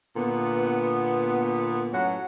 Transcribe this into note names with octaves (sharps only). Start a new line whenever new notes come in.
A#2 D3 B3
F#2 A2 F#3 C#4 F#5